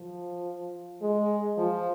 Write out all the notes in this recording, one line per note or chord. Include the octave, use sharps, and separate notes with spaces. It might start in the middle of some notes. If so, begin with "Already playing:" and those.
Already playing: F3
G#3
F3